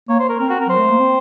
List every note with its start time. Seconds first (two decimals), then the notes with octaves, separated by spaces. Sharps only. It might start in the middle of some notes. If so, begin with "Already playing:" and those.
0.09 A#3 C#5
0.20 C5
0.29 A#4
0.39 C4 A#4
0.50 F#4
0.60 A#4
0.67 F#3 C5
0.77 A3
0.89 A#3
1.00 C4